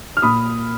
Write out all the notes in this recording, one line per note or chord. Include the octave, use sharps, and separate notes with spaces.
F6
A#2 B5 D#6